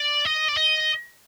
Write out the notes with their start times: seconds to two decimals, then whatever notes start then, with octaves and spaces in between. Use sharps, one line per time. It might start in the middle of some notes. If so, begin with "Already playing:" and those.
Already playing: D5
0.25 D#5
0.48 D5
0.57 D#5